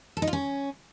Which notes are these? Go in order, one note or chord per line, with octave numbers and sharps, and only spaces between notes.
A4
D#4
F4
C#4